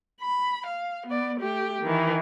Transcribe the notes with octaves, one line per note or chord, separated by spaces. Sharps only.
B5
F5
B3 D5
A3 G4
D#3 E3